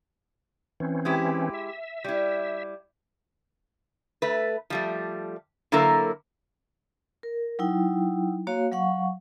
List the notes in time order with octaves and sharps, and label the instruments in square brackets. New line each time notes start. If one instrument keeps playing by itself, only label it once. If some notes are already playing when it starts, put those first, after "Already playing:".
[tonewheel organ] E3 C4 C#4
[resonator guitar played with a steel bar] G#3 E4 G4
[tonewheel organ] E5
[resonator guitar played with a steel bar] G3 E4
A3 B4
F3 G3 A3
D3 F#3 A#3 E4 A4 A#4
[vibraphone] A#4
F#3 D#4 E4 G5
A#3 F#4 C#5 F5
F#3 F5 F#5 C#6